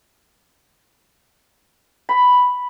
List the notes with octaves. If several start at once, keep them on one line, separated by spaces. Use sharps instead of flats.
B5